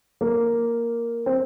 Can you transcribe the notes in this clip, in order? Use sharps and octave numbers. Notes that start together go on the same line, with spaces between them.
A#3
C4